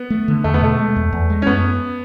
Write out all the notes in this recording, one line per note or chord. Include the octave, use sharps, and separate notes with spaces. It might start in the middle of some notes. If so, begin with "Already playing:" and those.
Already playing: B3
A3
D3
E2 A3
B3
B2 A3
G#3
E2
E2
G#3
C#4
F#2 B3